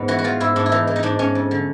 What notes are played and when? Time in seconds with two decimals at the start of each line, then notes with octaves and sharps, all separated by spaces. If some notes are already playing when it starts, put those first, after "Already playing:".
Already playing: G#2 B3
0.08 E3 F#4
0.19 F#4
0.24 E3 F4
0.40 G#2 E4
0.56 G#2 D4
0.66 E4
0.72 E3 D#4
0.87 E3
0.96 D#4
1.03 G#2 D4
1.19 G#2 C#4
1.35 F2
1.51 D3